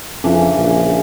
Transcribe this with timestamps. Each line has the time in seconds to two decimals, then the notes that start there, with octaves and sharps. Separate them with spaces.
0.24 F2 C#3 E3 D4
0.57 A#1